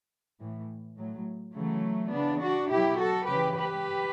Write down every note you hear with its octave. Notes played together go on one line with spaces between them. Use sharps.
A2 E3
A2 F#3
C#3 E3 F#3 A3
C#3 E3 B3 D4
D4 F#4
B2 F#3 E4 G4
F#4 A4
C#3 E3 G4 B4
G4 B4